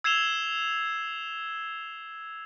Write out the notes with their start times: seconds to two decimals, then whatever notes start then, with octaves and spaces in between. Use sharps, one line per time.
0.04 E6 G#6 C7 E7 F7 G7